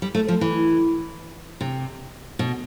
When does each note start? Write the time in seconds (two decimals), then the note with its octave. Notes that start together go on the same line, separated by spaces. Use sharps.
0.02 G3
0.15 A3
0.28 F3
0.41 E3
1.61 C3
2.39 B2